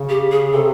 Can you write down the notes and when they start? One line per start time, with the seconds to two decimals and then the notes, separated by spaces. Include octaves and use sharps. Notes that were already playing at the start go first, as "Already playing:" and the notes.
Already playing: C#3
0.09 G4
0.32 G#4
0.53 C3 A4